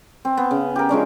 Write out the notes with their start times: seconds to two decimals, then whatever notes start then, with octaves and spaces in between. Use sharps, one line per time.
0.25 C4
0.37 B3
0.51 C#3
0.76 G4 A#4
0.89 F3 G#3 C#4 D4